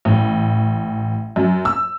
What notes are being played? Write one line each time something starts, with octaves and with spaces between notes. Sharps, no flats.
A1
F#2
E6